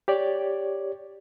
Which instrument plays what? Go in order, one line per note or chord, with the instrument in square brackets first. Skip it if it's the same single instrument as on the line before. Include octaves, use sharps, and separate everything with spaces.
[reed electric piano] G4 C#5 D5